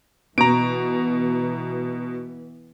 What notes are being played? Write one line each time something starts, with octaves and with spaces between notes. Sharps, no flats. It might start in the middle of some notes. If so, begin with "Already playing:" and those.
B2 E3 B3 A#5 D7